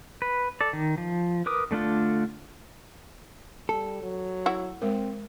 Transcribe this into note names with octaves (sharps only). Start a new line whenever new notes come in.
B4
A4 D5
D#3
F3
A#4 B4 D6 D#6
D3 A3 D4 F4 A4
G3 A4
F#3
E4 F#4
G#3 C4 A#4